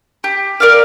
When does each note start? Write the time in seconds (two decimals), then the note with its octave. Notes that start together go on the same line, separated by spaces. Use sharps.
0.24 G4
0.60 A#4 D5 F5